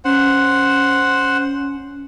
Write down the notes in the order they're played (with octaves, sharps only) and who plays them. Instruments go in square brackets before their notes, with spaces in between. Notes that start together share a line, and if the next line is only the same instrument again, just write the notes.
[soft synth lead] C#4 [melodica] C5 F#5